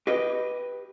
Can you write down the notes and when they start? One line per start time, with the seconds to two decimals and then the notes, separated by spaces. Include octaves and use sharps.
0.07 G4 B4 D#5